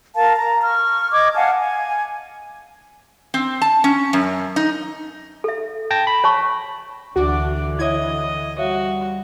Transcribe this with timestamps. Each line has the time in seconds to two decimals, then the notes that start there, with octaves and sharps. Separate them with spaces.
0.16 A#4 F5 A5
0.37 A#5
0.65 C#6 F6
1.12 D#5 C#6 D6 G#6
1.34 F5 F#5 G#5 A5
1.58 G#5
3.34 C4
3.62 A5
3.84 C#4
4.13 F#2
4.56 D#4
5.44 A4 E5
5.91 G5 A5 A#6
6.07 B5
6.24 C#5 A5 C#6
7.16 D2 D3 E3 D4 F#4 D5
7.79 E4 C#5 D#5 E5 G#6
8.58 G3 F#4 C#5 E5 F5